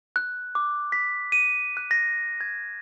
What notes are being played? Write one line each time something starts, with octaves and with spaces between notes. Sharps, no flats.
F#6
D6
B6
D#7
F#6
A#6
G#6